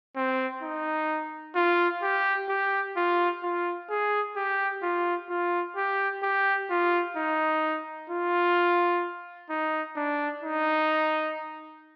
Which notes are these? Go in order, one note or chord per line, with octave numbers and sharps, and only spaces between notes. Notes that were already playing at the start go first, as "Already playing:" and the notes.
C4
D#4
F4
G4
G4
F4
F4
G#4
G4
F4
F4
G4
G4
F4
D#4
F4
D#4
D4
D#4